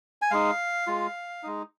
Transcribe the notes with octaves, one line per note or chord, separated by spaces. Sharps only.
G#5
G#3 D#4 F5
G#3 F4
G#3 D#4